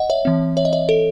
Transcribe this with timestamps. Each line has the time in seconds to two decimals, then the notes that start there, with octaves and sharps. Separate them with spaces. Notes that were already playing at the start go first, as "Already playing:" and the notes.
Already playing: D#5 F#5
0.10 C#5 E5
0.25 E3 C4
0.57 C#5 E5
0.65 D#5
0.73 C#5 E5
0.89 A4